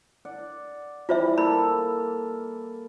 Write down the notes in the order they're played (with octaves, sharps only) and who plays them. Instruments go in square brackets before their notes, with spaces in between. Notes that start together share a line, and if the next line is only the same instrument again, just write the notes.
[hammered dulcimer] D5 F#5
[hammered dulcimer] E3 G3 [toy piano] F4 C5 E5
[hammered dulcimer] A#3 A4 E5 [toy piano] B5